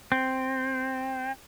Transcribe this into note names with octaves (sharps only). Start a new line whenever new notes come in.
C4